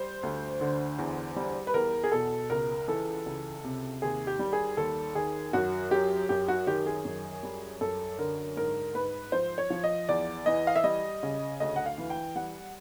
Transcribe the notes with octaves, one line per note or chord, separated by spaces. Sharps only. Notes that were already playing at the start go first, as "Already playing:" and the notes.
Already playing: G3 C5
D2
D3
E2
G3
B4
E2 A#4
G#4
B2 A4
C#2 A#4
E3 A4
C#2
C3
D#2 G#4
G4
G3
G#4
D#2 A4
D#3 G#4
F#2 F#4
F#3 G4
F#2 G4
F#4
D#3 G4
G#4
F#2
G3
F#2 A4
D3 A#4
G#2 A#4
G#2 B4
F3 C5
C#5
F3
D#5
E2 D5
E3 D#5
F5
E5
G3 D#5
C#3
D2 D#5
F#5
F5
E3
G5
G3 F#5